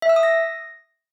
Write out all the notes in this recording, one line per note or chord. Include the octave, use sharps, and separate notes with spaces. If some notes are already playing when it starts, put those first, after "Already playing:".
E5
E6
D#6
A#6